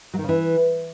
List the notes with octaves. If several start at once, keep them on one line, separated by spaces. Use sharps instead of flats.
F#3
D#3
C#3
E3